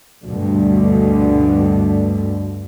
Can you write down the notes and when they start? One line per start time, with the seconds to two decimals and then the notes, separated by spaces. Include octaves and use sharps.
0.25 D2 G2 B2 D3